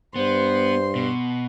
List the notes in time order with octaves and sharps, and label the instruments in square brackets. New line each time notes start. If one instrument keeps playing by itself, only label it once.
[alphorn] G2 [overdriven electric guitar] B3 [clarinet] C5 [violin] C6
[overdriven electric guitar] B2